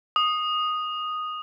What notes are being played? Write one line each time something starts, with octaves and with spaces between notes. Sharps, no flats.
D#6